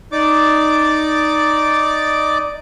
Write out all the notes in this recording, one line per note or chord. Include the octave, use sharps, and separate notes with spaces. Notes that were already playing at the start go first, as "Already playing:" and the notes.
D#4 D5 D6